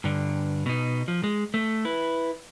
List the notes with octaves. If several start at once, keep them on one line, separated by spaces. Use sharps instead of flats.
G2 D3
B2 D#4
F3
G#3
A3
E4 B4